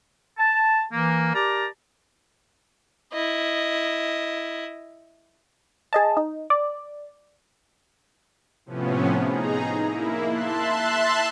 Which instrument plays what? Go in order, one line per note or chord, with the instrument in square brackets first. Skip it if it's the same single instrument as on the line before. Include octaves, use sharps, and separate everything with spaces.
[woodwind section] A5
E3 A#3
G4 A#4 D5 A5 A#5
[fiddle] E4 D#5
[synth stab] G#4 D#5 A5
D#4
D5
[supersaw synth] A2 C3 F3 B3 C#4
D#4 G#4 A#5
A#3 E4
E5 A5 C6 F#6